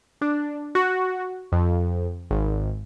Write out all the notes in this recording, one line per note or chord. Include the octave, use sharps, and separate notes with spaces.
D4
F#4
F2
G#1